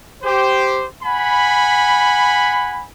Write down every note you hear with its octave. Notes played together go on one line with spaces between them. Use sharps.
G4 C5
F#5 G#5 B5